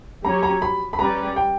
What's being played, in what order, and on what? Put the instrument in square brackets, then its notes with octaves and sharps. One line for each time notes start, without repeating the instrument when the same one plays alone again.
[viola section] F#3 C#4 G4 C#5 [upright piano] A#5
[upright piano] A#5
B5
B5
[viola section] G3 C#4 G4 B4 D5 [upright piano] A#5
[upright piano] G5